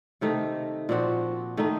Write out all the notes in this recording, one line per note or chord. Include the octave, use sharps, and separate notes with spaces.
C3 D#3 A3 D#4
A#2 F3 C4 F#4
D#3 A3 D#4